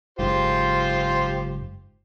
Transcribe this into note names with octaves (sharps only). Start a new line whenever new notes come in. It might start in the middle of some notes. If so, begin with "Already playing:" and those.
F#1 G#2 F4 G4 C5